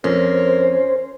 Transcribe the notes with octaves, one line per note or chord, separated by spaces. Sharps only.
F2 C#4 A#4 C5